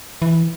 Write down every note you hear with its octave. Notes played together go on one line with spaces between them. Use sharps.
E3